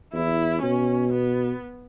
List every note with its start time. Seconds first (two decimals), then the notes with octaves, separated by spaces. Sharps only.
0.13 E2 E4
0.62 B2 C#4
1.13 B3